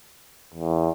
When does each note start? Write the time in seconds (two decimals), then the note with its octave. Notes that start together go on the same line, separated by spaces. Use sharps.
0.55 E2